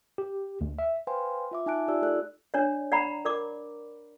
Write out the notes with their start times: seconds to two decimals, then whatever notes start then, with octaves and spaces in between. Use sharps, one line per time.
0.18 G4
0.61 D2
0.79 E5
1.07 B4 C5 F5 G5 G#5 C6
1.51 F4 E5 D6
1.66 D#4 E5 G#5 A5 F#6 D7
1.88 D#4 F4 G4 D5 E6
2.02 A3 D#4 G#4 A4 D5 F#6
2.54 D4 C#5 D5
2.92 D5 F#5 A#5 B5
3.25 A#4 D5 D6